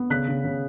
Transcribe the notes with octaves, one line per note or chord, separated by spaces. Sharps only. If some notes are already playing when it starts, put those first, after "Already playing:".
Already playing: B3
C#3 F#6 B6
C#3
C#3